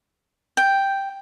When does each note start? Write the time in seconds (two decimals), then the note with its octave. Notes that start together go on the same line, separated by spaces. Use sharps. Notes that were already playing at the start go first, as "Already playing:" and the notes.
0.57 G5